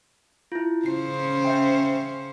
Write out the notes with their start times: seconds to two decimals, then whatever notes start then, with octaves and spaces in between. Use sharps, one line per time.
0.52 E4 F4
0.86 C#3 C#4 C5 C7
1.44 E5 G5